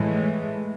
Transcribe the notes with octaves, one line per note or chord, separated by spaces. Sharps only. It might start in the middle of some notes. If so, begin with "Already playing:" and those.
Already playing: A2 E3 G#3